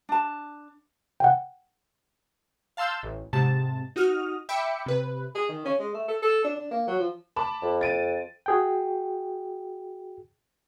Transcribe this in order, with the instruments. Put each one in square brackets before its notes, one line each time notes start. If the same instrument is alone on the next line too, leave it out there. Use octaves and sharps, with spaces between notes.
[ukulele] D4 A5
[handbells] F#5 G5
[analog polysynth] F5 A5 C6 E6 G6
A1
G#2 C3 A5
D#4 F#4 D#6 F6
E5 G5 B5 D6 C#7
C3 B4
[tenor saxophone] G#4
D#3
C#4
G#3
A3
A4
A4
D4
D4
A#3
F#3
F3
[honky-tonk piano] A5 B5 D6
[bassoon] F2
[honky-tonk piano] A6 D7 D#7
[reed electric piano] F#4 G#4 G5